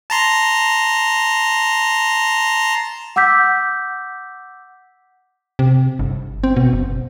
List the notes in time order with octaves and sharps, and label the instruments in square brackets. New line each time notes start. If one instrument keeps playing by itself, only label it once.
[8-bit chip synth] A5 A#5 C6
[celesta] F#5 D6 E6 G6 B6
[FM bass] C3
G1
C4
B2
F#1